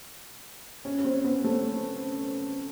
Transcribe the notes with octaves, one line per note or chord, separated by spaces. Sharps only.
C#4
C#4
C4
B3
A3